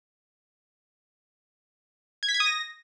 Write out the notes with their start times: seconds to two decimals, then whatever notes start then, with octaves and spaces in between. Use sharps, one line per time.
2.23 G#6
2.29 B6
2.34 G#6
2.40 D#6
2.46 A#6